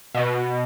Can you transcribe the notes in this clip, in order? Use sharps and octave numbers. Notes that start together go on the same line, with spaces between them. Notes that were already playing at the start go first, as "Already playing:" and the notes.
B2